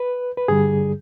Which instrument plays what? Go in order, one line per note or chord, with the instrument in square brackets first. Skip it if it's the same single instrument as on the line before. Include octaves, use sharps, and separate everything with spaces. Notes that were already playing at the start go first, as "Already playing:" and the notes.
Already playing: [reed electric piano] B4
B4
G2 D3 G3 G#4